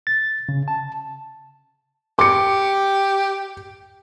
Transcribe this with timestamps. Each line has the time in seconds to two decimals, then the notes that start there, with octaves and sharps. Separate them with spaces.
0.07 A6
0.49 C#3
0.68 A5
2.19 G4 D6 C#7